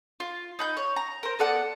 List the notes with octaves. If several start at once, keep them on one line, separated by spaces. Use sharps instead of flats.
F4
D#4 B5 G6
C#5
A#5
A#4 C5
B3 A4 D5 F#5